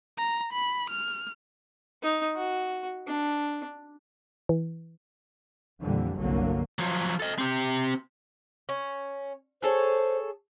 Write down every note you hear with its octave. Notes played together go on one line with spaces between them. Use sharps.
A#5
B5
F6
D#4
F#4
D4
E3
F2 A#2 D3 E3 G3
G1 C2 D3 F#3 A#3
F3 F#3
A4 D#5
C4 G4
C#4
G#4 A4 C5 C#5